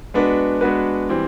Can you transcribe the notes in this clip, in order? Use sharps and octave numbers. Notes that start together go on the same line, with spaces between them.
G#3 B3 D4 F#4 B4
G#3 B3 D4 F#4 B4
E3 G3 C4